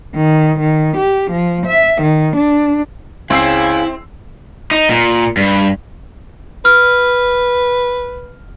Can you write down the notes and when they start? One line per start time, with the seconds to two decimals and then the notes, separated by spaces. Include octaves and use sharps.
0.15 D#3
0.60 D#3
0.97 G4
1.31 F3
1.67 E5
2.02 D#3
2.36 D4
3.30 C#2 C#3 C4 E4 F5 G#5 E6 C7
4.71 D#4
4.89 A#2
5.37 G2
6.65 B4 F6